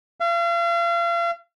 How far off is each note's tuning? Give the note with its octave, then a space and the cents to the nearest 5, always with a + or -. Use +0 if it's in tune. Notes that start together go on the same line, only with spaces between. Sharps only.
F5 -40